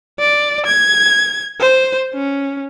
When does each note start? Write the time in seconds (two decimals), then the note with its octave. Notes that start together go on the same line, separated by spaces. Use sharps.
0.19 D5
0.65 G#6
1.60 C5
2.14 C#4